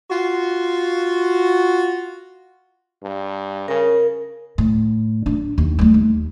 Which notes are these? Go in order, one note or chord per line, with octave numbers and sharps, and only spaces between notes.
F4 F#4
G2
C#3 A#4
A2
D4
D#2
G3 A3
D#2